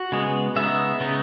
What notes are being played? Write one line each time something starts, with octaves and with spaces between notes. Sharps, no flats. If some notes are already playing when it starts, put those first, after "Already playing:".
Already playing: F#4
C#3 G#3 B3
C#3 G#3 B3 D#4 E5
C#3 G#3 B3 D#4